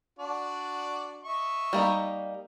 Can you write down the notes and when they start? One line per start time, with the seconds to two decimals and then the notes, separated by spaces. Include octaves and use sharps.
0.19 D4 F#4 D5
1.23 D#5 E5 C#6
1.73 G3 A#3 D#4